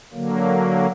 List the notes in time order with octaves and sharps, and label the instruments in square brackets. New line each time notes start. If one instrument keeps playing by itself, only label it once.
[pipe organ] D3 F#3 A#3